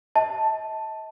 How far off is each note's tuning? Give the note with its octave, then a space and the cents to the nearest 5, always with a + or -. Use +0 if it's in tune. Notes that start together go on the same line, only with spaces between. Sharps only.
D#5 +40 A5 +0